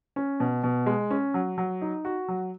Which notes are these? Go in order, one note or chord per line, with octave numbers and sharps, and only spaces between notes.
C#4
B2
B2
G#3
C#4
F#3
F#3
D#4
F#4
F#3